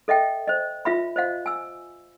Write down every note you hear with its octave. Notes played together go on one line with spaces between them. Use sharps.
A4 D#5 E5 G5
C5 D#5
F4 E5 B5
C5 D#5 F5
G#5 E6